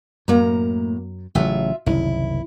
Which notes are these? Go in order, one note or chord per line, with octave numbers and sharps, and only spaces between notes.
F#2 A2 A#3 A#5
A1 C#3 F#3 F4 E5
F#1 C2 D#3 E4